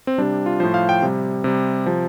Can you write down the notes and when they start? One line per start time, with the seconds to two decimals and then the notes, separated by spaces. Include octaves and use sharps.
0.07 C4
0.18 C3 G3 D4
0.46 F4
0.60 A2 F3 C5
0.74 F5
0.89 G5
1.02 C3 G3
1.44 C3 G3
1.86 C3 F3